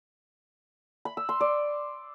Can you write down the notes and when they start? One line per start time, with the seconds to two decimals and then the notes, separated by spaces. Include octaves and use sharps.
1.05 B5
1.17 E6
1.29 C6
1.41 D5